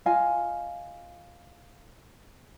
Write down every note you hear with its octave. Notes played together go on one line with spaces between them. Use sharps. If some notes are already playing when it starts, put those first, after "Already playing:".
F4 D#5 F5 G#5